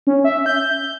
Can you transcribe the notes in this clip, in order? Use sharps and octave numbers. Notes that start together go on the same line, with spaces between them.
C#4
E5
G6